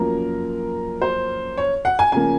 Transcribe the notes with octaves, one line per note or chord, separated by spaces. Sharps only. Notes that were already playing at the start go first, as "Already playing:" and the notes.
Already playing: F#2 F3 A#3 A#4
C5
C#5
F#5
G#5
C#3 F3 A#3 G#5